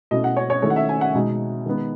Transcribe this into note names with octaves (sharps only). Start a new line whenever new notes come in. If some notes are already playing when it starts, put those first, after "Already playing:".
B2 A3 C#4 E4 D#5
F#5
C#5
C#5
D#3 A3 E4 C#5
F#5
E5
G#5
F#5
B2 G#3 D#4
D#3 G#3 B3 D#4